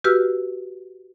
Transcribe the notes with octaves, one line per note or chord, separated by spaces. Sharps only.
F#4 G4 B4 E6 F6